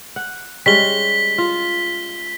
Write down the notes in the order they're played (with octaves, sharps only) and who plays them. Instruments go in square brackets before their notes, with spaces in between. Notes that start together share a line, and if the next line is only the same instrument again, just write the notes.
[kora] F#5
[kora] G3 G#3 C#4 [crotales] B6 G7
[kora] F4